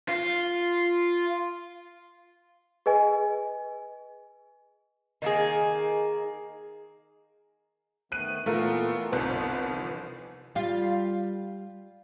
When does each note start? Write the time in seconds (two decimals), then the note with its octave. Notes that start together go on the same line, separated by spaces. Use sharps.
0.09 F4
2.86 G#4 B4 D#5 G#5
5.22 D#3 A#3 G#4
8.12 D#3 A3 B3 F#6 D#7
8.46 A#2 E3 A3 B3 F4 A#4
9.12 G1 C2 B3 D#4 F4 C5
9.70 E3 F3
10.55 G3 F4